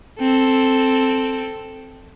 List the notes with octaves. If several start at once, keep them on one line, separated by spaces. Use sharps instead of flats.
C4 A4